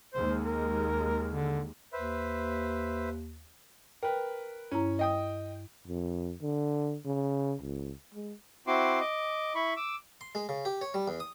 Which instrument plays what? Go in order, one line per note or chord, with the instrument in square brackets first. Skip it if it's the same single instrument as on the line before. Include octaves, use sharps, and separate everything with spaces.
[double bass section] D#2 G#3 [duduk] C5
[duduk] A#4
D3
[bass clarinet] D#2 [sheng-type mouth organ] B4 C5 E5
[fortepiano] A#4 B4 [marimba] G5
[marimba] G2 E4 A#5 [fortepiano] C#4
[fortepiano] D#5 G5 D#6
[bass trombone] F2
D3
C#3
C#2
G#3
[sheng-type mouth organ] C4 E4 F#4 C6 D6
D#5 D6
E4 B5 C#6
D6 E6
[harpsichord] C6
G#3
C#3
G4
C#5
G3
E2
D#6